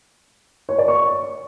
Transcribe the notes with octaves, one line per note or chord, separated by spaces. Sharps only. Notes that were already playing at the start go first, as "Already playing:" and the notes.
C#5
D5
C#6